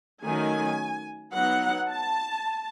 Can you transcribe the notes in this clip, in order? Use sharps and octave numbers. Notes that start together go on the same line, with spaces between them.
D#3 F#3 A3 C#4 G#5
F#3 B3 D#4 F#5
A5